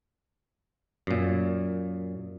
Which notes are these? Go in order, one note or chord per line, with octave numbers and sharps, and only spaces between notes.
F#2 A#2